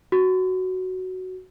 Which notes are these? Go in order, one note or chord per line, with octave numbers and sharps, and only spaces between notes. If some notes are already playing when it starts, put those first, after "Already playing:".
F#4